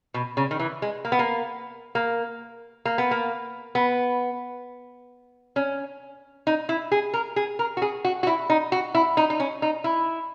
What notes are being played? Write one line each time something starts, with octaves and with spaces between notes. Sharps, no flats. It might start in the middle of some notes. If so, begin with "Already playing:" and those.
B2
C#3
D#3
E3
G#3
A#3
B3
A#3
A#3
A#3
B3
A#3
B3
C#4
D#4
E4
G#4
A#4
G#4
A#4
F#4
G#4
F#4
F#4
E4
D#4
F#4
E4
D#4
D#4
C#4
D#4
E4